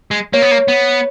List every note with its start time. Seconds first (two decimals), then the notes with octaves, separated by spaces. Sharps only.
0.11 G#3
0.33 A#3 C#5
0.42 B3
0.51 A#3
0.68 B3